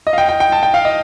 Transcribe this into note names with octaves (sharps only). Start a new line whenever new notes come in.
D#5
F5
G5
G5
G5
A5
G5
F5
D#5